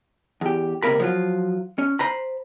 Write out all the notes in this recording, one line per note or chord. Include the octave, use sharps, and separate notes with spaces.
E2 G4
C#2 C3 A3 A#3 A#4 B5
F3 F#3 F4
C#4
C5 A#5 B5